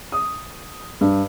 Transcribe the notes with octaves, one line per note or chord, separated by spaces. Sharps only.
D#6
G2